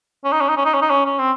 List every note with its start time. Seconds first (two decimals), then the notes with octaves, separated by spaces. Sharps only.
0.25 C#4
0.32 D#4
0.41 C#4
0.49 D#4
0.57 C#4
0.65 D#4
0.74 C#4
0.81 D#4
0.90 C#4
1.05 C#4
1.19 C4